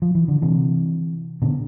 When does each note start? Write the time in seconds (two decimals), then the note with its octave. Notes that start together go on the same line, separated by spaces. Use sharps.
0.02 F3
0.15 E3
0.28 D3
0.42 C3 E3
1.42 B2 D3